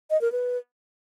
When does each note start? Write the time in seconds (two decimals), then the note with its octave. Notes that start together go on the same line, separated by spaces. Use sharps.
0.10 D#5
0.21 A#4
0.32 B4